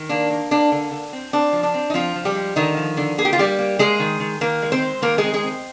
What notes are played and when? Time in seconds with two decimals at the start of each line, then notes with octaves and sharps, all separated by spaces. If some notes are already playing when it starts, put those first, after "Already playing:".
Already playing: D#3
0.09 A#3 D4
0.30 A#3
0.51 A#3 D4
0.72 D3
0.91 D3
1.13 C4
1.33 C4 D4
1.53 F3
1.63 D4
1.74 C4
1.90 D#4
1.94 F3 C4 F4
2.16 F3
2.25 G3 G4
2.35 G#3
2.56 D3 D#3 D#4
2.77 F3
2.97 D3
3.18 A#3 G#4
3.25 G4
3.33 F4
3.38 G3 A#3 G4
3.59 A#3
3.79 G#3 A#3 G#4
4.00 D#3
4.20 D#3
4.41 D#3 A#3 A#4
4.62 G#3
4.72 C4 C5
4.82 G#3
5.02 D#3 A#3 A#4
5.18 G#3 G#4
5.24 C4
5.34 G#3 G#4
5.43 C4